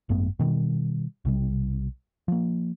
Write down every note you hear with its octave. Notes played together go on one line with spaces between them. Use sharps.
G#1 F#2 A3 B3
B2 D#3 F#3 G3
B1 C3 G3
F3 A#3